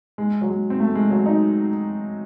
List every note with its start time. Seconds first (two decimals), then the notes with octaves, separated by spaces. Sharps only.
0.18 G#3
0.41 F#3
0.50 G#3
0.70 C4
0.80 A3
0.95 G#3
1.10 F#3
1.26 D#4